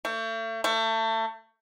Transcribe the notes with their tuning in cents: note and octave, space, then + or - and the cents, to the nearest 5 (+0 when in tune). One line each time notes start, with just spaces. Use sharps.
A3 +40
A3 +30